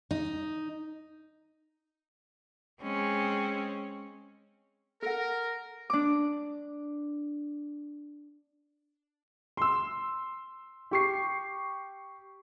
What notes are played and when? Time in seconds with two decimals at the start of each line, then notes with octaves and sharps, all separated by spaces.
0.11 D#4
2.83 G#3 C4 C#4
5.02 A4 A#4 F#5
5.90 D4 D6
9.57 C6 E6
10.91 G4 C#6 C7